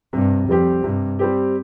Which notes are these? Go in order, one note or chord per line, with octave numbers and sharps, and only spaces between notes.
G2 C3
F2 G3 C4 G4
G2 C3
G3 C4 G4